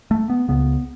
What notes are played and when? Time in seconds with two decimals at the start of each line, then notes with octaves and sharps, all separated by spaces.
0.11 A3
0.30 B3
0.48 C#2 C#3 B3